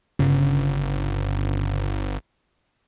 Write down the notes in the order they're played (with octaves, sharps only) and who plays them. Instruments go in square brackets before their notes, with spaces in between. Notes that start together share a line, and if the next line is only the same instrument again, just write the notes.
[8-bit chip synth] G1 [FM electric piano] C#3